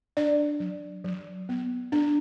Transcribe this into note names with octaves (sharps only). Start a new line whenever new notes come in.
D4 D5
F#3
F#3
B3
D4